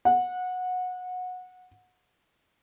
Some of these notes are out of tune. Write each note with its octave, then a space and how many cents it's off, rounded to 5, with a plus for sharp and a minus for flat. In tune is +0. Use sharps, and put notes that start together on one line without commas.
F#5 -20